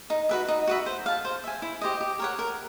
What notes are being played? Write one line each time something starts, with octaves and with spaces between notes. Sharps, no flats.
D#4
F#4 B4 E5
D#4
F#4 B4 E5
C5
F5 A5
C5
E5 G#5
E4
G4 C5 D#5
G4
A#4 C#5 F#5
A#4